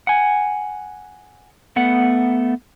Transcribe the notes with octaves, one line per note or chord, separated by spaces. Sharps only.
F#5 G#5
A3 B3 F#5